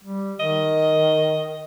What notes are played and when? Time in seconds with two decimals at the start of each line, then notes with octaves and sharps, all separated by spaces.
0.04 G3
0.40 D#3 D#5